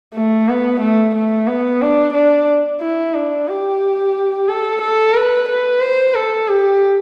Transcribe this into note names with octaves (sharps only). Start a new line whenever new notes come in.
A3
B3
A3
A3
B3
D4
D4
E4
D4
G4
A4
A4
B4
B4
C5
A4
G4